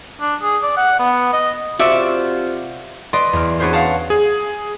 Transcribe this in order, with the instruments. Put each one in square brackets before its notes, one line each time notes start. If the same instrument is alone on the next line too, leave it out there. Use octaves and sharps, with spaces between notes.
[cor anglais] D4
G#4
D5
F#5
B3
D#5
[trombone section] C3 F4 C5 [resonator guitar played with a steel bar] F#4 D5 E5
[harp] B4 D5 D#5 C6 D6 D#6
E2 F6
C#4 D4 F#4 G#4 B4 C5
F5 F#5 A5
[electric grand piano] G#4